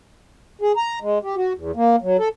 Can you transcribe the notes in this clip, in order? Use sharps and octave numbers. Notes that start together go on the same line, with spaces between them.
G#4
A#5
G#3
G4
F#4
E2
A#3
F#3
A4